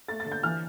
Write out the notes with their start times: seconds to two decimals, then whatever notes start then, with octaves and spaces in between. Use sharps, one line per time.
0.08 A3 A6
0.20 A6
0.26 D3
0.32 G6
0.43 E3 F6